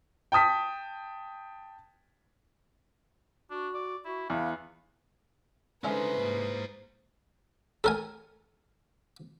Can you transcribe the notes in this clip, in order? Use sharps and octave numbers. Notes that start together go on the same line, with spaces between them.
G5 A5 D#6 B6
D4 F#4
D5
E4 F#4
E2 B3 F5
D3 G#3 C#4 D#4 E4 B4 C5 E5
G#2 A#3
A4 A#4 G#5